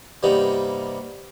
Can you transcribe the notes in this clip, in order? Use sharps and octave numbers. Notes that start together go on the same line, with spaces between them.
G2 C3 G3 A#3 B3 D#4